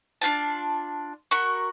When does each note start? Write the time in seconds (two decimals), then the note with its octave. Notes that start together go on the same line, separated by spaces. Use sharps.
0.21 D4 F4 F#4 A5
1.31 F#4 A#4 B5 C#6